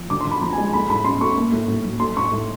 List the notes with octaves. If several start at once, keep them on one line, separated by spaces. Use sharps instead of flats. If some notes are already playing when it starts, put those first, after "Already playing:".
Already playing: F3
D3 D6
D3 C6
B5
F3 A#5
G#3 G#5
A3 B5
A2 B5
C#4 C6
A3 C#6
A#3
A2
A2
F#3
A3 C6
A2 C#6
A2